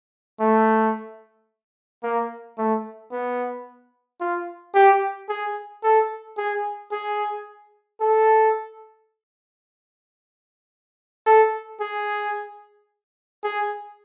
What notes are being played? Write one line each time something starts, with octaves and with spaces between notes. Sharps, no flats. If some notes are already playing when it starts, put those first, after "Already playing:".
A3
A#3
A3
B3
F4
G4
G#4
A4
G#4
G#4
A4
A4
G#4
G#4